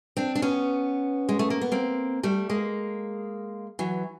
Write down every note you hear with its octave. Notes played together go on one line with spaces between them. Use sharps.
C4 D4
D4
B3 C#4
G#3
A3
A#3
B3
A#3 C4
G3 A3
G#3 A#3
E3 F#3